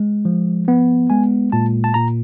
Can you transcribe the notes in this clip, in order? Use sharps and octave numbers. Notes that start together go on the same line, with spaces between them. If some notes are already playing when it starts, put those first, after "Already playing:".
Already playing: G#3
F3
B3
G#3 G#5
A#2 A5
A5
A#2 A#5